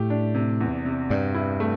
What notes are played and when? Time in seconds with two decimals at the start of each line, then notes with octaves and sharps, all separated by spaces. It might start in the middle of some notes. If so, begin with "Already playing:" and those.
Already playing: A2 A3 G4
0.10 D4
0.34 C3
0.61 E2
0.85 C3
1.10 G2 D5
1.34 E4
1.60 A3